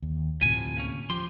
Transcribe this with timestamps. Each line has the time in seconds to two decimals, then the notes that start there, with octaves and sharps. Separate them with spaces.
0.02 D#2
0.41 D2 A2 C3 F3 G#5
0.77 A#3 C#4
1.10 F3 G4 C6